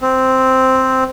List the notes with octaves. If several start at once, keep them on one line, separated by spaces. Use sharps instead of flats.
C4